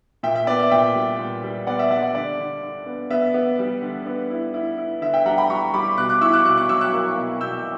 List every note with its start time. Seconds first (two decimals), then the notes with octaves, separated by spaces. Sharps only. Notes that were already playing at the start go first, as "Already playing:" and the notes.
0.23 A#2 E5 G5
0.36 E5
0.47 B3 D5
0.59 E5
0.71 A#2 E5 G5
0.95 G3
1.19 A#2
1.43 G3
1.67 B3 D5 F#5
1.79 E5
1.91 G3 D5 F#5
2.03 D5
2.15 D3 D5
2.39 D3
2.63 D3
2.86 B3
3.10 B3 E5
3.34 B3
3.59 G3
3.82 D3
4.06 B3
4.30 E4
4.54 E4
4.78 E4
5.02 D3 E5
5.14 E5 G5
5.26 G3 F#5 A#5
5.37 G5 B5
5.50 G3 A#5 C#6
5.74 G3 B5 D6
5.97 B2 D6 F#6
6.09 D6 F#6
6.21 E4 C#6 E6
6.33 D6 F#6
6.45 B2 D6 F#6
6.58 D6 F#6
6.69 F#3 C#6 E6
6.81 D6 F#6
6.93 A#3
7.17 B2
7.41 B2 E6 G6